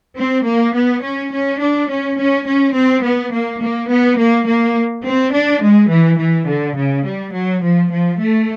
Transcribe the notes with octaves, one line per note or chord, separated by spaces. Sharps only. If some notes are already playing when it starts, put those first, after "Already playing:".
C4
A#3
B3
C#4
C#4
D4
C#4
C#4
C#4
C4
B3
A#3
A#3
B3
A#3
A#3
C4
D4
G#3
E3
E3
D3
C#3
G3
F#3
F3
F3
A3